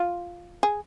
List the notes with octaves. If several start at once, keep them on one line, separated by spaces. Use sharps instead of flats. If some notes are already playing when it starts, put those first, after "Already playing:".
Already playing: F4
G#4